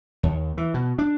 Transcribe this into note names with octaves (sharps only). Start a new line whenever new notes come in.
D#2
E3
B2
D4